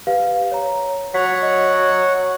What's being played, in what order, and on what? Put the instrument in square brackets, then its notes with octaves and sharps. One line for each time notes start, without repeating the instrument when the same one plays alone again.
[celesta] G4 B4 F5
C#5 A#5
[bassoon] F#3 [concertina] C#5 F#5 [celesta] B6 F7
[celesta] D#5